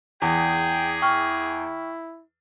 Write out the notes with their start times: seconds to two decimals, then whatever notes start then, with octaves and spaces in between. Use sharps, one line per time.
0.22 E2 G#4 G5
1.02 E4 G5 C#6 F6